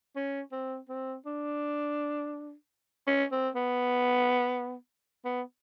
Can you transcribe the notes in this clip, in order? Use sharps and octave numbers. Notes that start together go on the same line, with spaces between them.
C#4
C4
C4
D4
C#4
C4
B3
B3